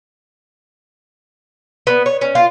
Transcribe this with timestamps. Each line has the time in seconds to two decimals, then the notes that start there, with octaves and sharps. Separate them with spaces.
1.87 B3
2.06 C#5
2.21 C#4
2.35 F4